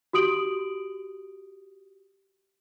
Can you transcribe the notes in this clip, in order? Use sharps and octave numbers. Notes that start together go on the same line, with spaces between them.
F#4 G4 D#6 D7 F#7